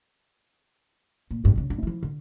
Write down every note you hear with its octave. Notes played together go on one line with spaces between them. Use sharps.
A#2
F1 G2
G2 C#3
G2
F3 E4
D3